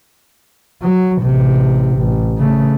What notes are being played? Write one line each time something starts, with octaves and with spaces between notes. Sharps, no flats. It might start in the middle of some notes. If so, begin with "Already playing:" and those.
F#3
A1 C3
A1
C#3 A3